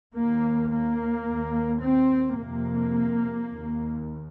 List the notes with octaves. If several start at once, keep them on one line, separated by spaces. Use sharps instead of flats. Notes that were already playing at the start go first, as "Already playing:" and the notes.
D#2 A#3
A#3
D#2
C4
F2 C3 A#3
D#2